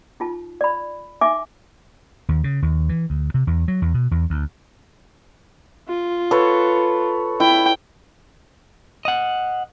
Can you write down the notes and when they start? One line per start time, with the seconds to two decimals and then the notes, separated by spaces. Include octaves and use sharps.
0.20 D#4 F4 A5
0.61 D5 B5
1.21 D#4 E5 G#5 D6
2.29 D#2
2.44 C#3
2.62 D#2
2.89 E3
3.10 D2
3.34 C3
3.47 E2
3.68 F#3
3.82 E2
3.94 B2
4.11 E2
4.30 D2
5.88 F4
6.31 A4 B4 C#5
7.40 E4 G5
9.05 D#5 F#5